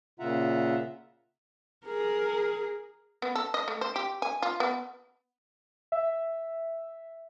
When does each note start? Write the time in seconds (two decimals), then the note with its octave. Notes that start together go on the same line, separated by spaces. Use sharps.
0.20 A#2 C#3 F4 E5 F#5 A#5
1.86 G#4 A#4
3.22 B3
3.35 A4
3.54 D#5
3.68 A3
3.81 C5
3.96 G4
4.22 G#5
4.42 F4
4.60 B3
5.92 E5